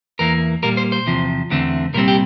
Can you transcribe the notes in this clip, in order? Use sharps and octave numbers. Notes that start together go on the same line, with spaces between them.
E2 E3 A#3 A#4
A#2 G3 A#3 A#4
C5
C5
E2 C3 F3
E2 D3 A3 C4
C2 A#2 G3 C4 A#4
G4